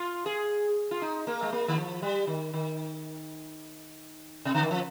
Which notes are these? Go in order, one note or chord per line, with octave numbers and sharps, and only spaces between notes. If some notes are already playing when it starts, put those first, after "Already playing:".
Already playing: F4
G#4
F4
D#4
A#3
G#3
A#3
D#3
F3
G3
D#3
D#3
C3
D3
D#3
F3